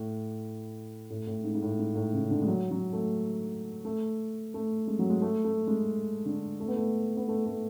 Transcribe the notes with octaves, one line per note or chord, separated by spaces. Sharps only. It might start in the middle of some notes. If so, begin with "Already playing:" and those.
Already playing: A2
A2
A2
G#2
G#2
A2
G#2
A2
C#3
D3
G#3
F#3
F#3
A3
A3
A3
G#3
F#3
G#3
A3
A3
G#3
D3
A3
B3
A3
B3
A3
A3